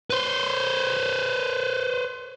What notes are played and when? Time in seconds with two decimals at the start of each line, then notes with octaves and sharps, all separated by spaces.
0.10 B4 C5